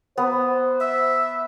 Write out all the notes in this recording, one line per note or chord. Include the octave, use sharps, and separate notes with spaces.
B3 C5
E5